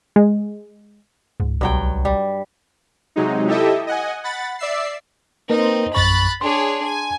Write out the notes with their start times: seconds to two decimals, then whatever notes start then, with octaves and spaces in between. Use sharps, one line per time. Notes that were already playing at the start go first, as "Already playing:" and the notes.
0.16 G#3
1.40 C#2 G#2
1.61 B1 G2 F#3 G5
2.05 G3
3.16 C3 F#3 G#3 D#4
3.47 E4 G4 A4 D#5 E5
3.87 D#5 F#5 G#5
4.24 F#5 B5 A6
4.59 D5 E5 E6 C7
5.50 A#3 C4 D#4 A#4 B4
5.95 A#1 F#2 B5 C#6 F#6 A6
6.41 D4 G#4 C#5 C6
6.84 G#5